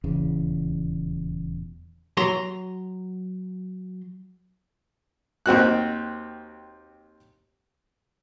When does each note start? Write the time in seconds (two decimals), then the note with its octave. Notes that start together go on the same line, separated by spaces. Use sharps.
0.04 D#1 E2 C#3
2.17 F#3 A#5 C6
5.46 D#2 C4 F#4 F#6